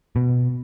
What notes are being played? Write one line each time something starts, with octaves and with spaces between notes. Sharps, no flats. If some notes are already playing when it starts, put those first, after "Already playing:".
B2